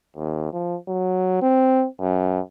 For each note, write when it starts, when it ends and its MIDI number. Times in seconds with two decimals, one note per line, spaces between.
0.16 0.48 39
0.53 0.76 53
0.88 1.41 54
1.42 1.86 60
2.00 2.40 42